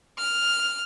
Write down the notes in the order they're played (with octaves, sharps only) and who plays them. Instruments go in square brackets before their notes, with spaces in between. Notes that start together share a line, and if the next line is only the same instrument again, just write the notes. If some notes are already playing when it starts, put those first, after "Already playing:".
[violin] F6